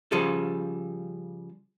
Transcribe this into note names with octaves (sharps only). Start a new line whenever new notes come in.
C#3 F3 G3 G#4 A4